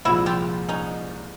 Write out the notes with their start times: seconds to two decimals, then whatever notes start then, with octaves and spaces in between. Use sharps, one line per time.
0.05 C2 A#2 F3 G#3 E4 F#4
0.26 F4 G4
0.69 C#4 D#4